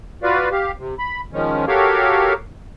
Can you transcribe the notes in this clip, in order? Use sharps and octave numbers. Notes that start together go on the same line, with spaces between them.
F4 F#4 B4 D5 F5
G4 F5
C3
B5
D#3 F3 G#3 C#4
F#4 G4 A4 A#4 C#5 F5